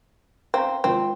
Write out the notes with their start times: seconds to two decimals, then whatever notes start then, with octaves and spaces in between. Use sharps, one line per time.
0.54 C4 F5 G5 A#5
0.84 G#1 F3 C4